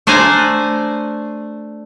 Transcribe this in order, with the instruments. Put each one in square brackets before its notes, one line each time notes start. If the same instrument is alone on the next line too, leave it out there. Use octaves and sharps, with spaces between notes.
[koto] A3 D4 C5 D5 G#5 A#5